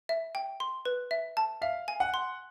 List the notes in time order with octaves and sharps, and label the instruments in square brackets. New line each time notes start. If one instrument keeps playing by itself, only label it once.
[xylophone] E5
G5
C6
B4
E5
A5
[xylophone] E5 [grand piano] F5
[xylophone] G#5
[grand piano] F#5
[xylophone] C6